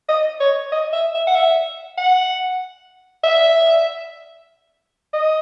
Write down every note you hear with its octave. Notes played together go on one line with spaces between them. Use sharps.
D#5
C#5
D#5
E5
E5
F#5
E5
F#5
E5
D#5